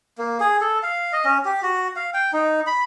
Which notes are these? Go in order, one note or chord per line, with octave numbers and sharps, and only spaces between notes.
A#3
G#4
A4
F5
D#5
C#4
G4
F#4
F5
G5
D#4
B5